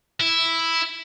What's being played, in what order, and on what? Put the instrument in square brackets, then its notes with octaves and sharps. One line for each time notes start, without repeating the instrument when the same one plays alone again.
[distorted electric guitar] E4